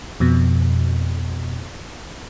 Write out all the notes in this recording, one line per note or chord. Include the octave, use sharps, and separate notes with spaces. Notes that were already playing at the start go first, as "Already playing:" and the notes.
F2 B2